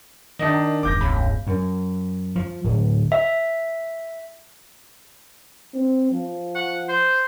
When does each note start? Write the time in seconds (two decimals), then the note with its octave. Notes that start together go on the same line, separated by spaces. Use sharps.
0.39 D#3 D4 D#4 D#5
0.83 E1 G2 D6 G6 A#6
1.01 C#2 B5
1.47 F#2
2.36 F3
2.64 D1
3.12 E5
5.74 C4
6.11 F3
6.55 F#5
6.89 C5